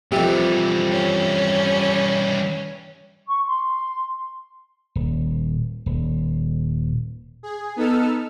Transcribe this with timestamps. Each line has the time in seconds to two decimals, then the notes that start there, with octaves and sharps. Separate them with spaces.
0.12 F2 C3 E3 G3
0.91 C#4
3.27 C#6
3.47 C6
4.95 D#1
5.86 D#1
7.43 G#4
7.76 B3 D#4 A4 E6 F6